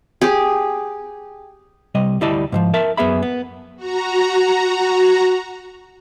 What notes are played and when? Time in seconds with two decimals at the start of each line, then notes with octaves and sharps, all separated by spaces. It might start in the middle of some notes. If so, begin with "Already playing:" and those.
0.21 G4 G#4
1.95 C3 G3 D#5
2.21 D2 G3 E4 D5 D#5 A5
2.52 G#2 E3 F3
2.74 A#4 E5 A5
2.97 F#2 B3 G#4 E5 B5
3.23 B3
3.76 F#4 A#5